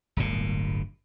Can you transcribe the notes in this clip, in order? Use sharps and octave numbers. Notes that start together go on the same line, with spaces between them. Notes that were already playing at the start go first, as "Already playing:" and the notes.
D1 G1 A#2